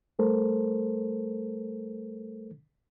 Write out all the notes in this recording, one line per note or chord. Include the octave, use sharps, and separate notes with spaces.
G3 A3 A4 A#4 C5